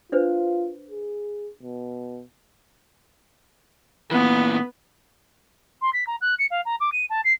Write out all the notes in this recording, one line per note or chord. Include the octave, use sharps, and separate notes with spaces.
D4 F4 B4 C5
G#4
B2
A#2 E3 B3
C6
B6
A#5
F#6
C#7
F5
A#5
D6
D#7
A5
C7